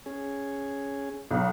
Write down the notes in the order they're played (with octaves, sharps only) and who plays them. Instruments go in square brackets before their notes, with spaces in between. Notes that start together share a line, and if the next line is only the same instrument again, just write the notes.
[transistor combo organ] C#4 G#4
[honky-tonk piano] B1